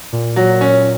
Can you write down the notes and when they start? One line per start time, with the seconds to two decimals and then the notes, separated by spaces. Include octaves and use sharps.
0.12 A#2
0.36 F#3
0.61 C#4